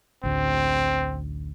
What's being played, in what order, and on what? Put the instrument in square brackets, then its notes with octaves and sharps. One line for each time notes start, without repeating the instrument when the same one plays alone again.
[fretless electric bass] A1 D2 [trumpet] C4